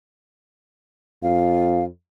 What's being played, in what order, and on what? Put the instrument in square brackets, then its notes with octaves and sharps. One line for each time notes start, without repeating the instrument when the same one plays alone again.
[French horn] F2 [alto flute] F5